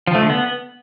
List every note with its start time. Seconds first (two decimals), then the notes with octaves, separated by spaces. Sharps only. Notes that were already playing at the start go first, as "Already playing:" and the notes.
0.07 F3
0.15 A3
0.22 D3
0.30 B3